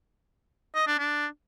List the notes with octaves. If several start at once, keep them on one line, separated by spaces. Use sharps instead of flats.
D#5
D4
D4